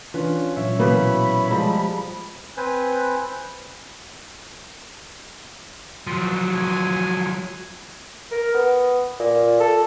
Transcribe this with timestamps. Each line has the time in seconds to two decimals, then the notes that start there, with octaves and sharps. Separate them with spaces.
0.14 E3 C#4 D4 F4 B4
0.57 A#2 F#3 C#4 C#5 E5
0.79 B2 E3 A#3 B5
1.51 F3 G3 G#3 C5 A5 A#5
2.57 C4 B4 C5 G#5
6.07 F3 F#3
6.56 G#5
8.31 A#4
8.54 B3
9.20 A#2
9.60 A4